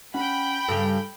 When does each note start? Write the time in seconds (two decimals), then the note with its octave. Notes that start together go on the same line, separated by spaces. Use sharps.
0.14 C#4 F#5 G5 B5
0.68 G2 C#3 A4